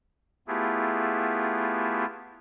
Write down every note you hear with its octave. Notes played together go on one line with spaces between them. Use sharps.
A3 B3 E4 F4 G4 G#4